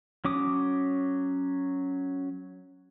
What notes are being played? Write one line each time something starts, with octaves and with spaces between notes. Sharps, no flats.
F#3 C#4 D6 D#6